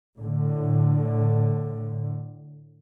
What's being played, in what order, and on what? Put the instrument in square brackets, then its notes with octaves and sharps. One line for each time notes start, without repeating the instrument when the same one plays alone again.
[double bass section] A2 D3